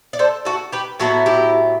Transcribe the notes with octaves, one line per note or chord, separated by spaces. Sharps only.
D5
A4 C5
F#4 A4
G4 B4
A2 F#3 B3 E4 F#4 A4
E4 G4